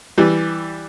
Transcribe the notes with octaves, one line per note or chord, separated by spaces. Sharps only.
E3 G3